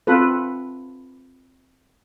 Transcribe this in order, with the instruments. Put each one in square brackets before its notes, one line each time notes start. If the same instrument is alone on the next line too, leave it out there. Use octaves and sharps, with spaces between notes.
[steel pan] C4 F4 A4 B4